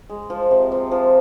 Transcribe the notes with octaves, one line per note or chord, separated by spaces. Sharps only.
G#3
F3
C3
C3
F3